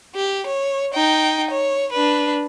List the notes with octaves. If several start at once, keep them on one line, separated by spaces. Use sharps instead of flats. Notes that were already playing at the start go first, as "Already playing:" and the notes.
G4
C#5
D#4 G5
C#5
D4 B4